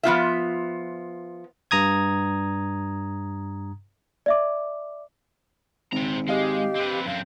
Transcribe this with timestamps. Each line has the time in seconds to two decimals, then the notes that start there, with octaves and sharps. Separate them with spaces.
0.03 F3 B3 F4 E5
1.71 G2 A#5 D#6 G#6
4.26 D5 E5 D6
5.92 G#1 C4 A#5
6.28 G#3 G4 D#5 F5 C7
6.75 C4 B4
7.06 F#2 C4 F5